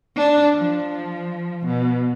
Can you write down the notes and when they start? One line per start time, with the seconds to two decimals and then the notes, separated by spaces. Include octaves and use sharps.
0.16 D4
0.55 F3
1.66 B2